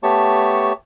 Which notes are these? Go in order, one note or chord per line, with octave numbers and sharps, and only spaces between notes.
A3 B3 G4 C#5 A5 C#6